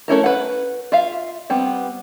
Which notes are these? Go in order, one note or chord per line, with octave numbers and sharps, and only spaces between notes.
A3 C#4 E4 A#4
B4 F#5
F4 E5 F5
G3 B3 C4